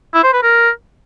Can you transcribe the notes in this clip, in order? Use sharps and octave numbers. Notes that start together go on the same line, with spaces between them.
E4
C5
B4
A#4